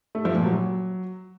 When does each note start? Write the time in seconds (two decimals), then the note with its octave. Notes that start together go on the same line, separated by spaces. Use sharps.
0.15 A3
0.25 F3
0.35 A#2
0.46 F#3